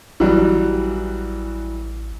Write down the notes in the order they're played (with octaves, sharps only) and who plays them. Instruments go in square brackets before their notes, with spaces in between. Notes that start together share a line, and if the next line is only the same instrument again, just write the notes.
[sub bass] A1 [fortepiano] E3 F#3 G3